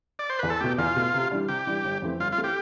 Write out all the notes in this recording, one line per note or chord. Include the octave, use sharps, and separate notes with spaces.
D5
C5
E2 B4
A4
B2 A3 G4
E2 F4
B2 A3
C3
E3 G3 D4
C3 G4
E3 G3 D4
G1
F2 E3 A3 C4
G1 F4
F4
E3 A3 C4
G4